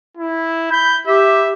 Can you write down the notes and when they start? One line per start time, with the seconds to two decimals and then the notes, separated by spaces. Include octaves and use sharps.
0.17 E4
0.71 B5 G6
1.07 G4 E5